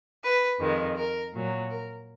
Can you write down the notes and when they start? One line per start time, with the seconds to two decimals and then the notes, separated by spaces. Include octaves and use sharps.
0.23 B4
0.60 F2 D#3 G#3
0.96 A#4
1.33 A#2 F#3
1.69 A#4